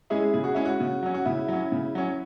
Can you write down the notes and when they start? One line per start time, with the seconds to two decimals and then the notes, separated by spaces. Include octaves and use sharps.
0.10 G#3 C#4 E4 G#4
0.34 C#3 G#4
0.44 F#4
0.55 G#3 C#4 E4
0.65 F#4
0.80 C#3
1.03 F#3 C#4
1.14 F#4
1.25 C#3 E4
1.48 F#3 C#4
1.72 C#3
1.95 F#3 C#4